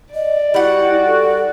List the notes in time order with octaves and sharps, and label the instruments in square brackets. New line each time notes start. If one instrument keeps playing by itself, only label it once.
[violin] D5 [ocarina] D#5
[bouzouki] G3 F#5 [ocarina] E4 [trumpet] F#4
[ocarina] A4